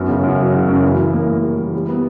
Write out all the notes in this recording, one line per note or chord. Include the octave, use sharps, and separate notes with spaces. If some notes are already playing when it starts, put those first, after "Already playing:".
Already playing: F#2 B3
C#3
F#2
F#3
C#3
F#2
E3
E3
A#3
A#3
G3
E3
G3
B3